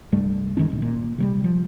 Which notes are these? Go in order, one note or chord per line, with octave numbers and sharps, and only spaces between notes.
C2 G2 G3 A3
G#2 D#3 C#4 D4
D1 A#1
A#2
C3 F#3 G3
F3